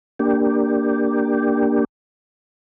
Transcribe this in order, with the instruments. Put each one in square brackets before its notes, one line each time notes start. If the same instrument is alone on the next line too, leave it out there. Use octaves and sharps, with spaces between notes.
[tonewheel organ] A#3 D4 G4